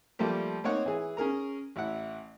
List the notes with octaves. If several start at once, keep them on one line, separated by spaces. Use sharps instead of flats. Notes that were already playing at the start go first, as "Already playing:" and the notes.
F3 G3 A3 A#3 G4
A#3 C4 D#4 C#5 F#5
E3 G#4
C#4 G#4 A#4 A#5
A1 E4 F#5